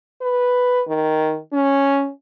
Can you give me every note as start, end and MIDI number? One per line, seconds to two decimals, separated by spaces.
0.22 0.81 71
0.88 1.38 51
1.53 2.10 61